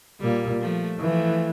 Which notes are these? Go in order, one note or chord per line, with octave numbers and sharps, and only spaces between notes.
A#2 G3 A#3
F3 A3
E3 F3 A3